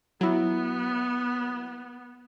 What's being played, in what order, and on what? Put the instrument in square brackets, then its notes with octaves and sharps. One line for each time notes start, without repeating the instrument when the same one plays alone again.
[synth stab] F#3 E4 [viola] B3